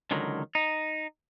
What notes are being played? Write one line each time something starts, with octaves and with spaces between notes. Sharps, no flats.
C#2 D3 D#3 F#3
D#4